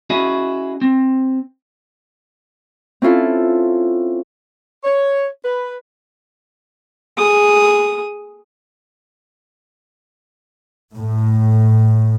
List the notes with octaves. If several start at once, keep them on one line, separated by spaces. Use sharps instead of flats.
C#4 E4 F#4 G#4 D#5
C4
C4 C#4 E4 F4 A4
C#5
B4
G#4 D#6
A2